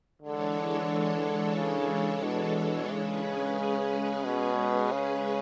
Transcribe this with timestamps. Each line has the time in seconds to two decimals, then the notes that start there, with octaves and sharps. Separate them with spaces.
0.22 D3 E3 G#3 D4 A4 C#5
1.56 C#3
2.23 B2
2.90 C#3 G#3 C#4 G#4 B4
4.24 B2
4.92 C#3